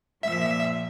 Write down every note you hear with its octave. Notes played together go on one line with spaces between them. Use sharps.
A#2 F3 E5